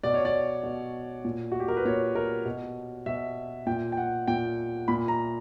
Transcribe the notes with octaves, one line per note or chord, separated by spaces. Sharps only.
B2 D5
C#5
D5
B2
A#2
F#4
G4
A#4
B4
A#2 C#5
A#4
B2
B2 E5
A#2 G5
G5
F#5
A#2 G5
A#2 B5
A#5